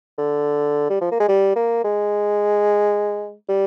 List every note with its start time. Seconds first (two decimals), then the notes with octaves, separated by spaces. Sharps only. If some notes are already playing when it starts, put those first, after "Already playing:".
0.18 D3
0.90 G3
1.01 F3
1.12 A#3
1.20 G#3
1.29 G3
1.56 A#3
1.84 G#3
3.49 G3